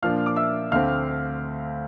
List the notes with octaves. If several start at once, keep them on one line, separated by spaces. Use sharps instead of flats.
A#2 F3 A#3 D4 F5 F6
D6
E5 E6
D2 D3 A3 C4 F5 F6